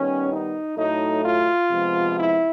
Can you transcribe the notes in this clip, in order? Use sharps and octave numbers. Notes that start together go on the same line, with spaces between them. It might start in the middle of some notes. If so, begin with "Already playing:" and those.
Already playing: D#3 G3 B3 C#4
D#4
A2 F#3 A3 D#4
F4
C3 F3 G#3 B3
E4